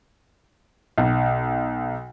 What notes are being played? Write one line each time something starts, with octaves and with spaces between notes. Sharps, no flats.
B1